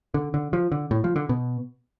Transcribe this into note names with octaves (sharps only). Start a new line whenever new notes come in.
D3
D3
F3
D3
A2
F3
D3
B2